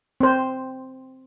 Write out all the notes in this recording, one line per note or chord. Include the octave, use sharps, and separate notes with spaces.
C4 C5